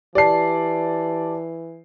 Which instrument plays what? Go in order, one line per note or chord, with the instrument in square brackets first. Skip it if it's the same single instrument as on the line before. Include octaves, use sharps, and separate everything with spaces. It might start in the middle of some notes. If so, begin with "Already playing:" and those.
[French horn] E3 [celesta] G4 A5 [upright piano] D5 C7